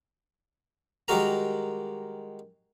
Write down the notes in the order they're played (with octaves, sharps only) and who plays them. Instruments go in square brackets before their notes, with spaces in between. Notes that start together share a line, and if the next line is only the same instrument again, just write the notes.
[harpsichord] D#3 G3 G#3 F#4 A#4 A#5